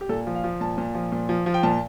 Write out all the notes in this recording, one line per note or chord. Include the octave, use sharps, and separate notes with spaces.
G4
A#2 A4
F3
F5
F3
A#2 A5
A#2
F3
A#2
F3
F3
G5
A#2 A5